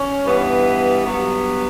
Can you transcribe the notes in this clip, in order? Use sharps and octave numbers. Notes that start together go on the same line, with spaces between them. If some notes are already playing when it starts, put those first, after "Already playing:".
Already playing: C#4
G2 E3 B3
G2 F#3 B3